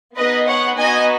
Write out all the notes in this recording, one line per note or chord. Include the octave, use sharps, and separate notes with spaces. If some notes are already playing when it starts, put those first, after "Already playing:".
B3 D#4 G#4 B4 D#5
C#5 F#5
B3 D#4 F#4 D#5 G#5